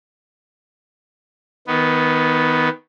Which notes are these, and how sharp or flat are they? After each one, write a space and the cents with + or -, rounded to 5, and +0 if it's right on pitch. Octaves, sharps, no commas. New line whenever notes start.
D#3 +25 B3 +5